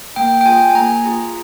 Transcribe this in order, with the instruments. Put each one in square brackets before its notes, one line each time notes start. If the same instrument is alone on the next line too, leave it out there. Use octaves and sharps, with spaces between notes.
[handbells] A#3 G5
G5
F4 G#4 G#5
G#5
A#3 A#5
F4 G#4